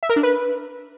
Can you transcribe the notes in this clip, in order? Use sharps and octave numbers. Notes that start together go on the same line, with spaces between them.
E5
A#4
D4
B4